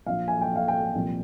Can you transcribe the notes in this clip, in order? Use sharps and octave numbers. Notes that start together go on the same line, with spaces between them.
A#1 A#2 F3 F5
G#5
G5
F5
G5
C2 A#2 F3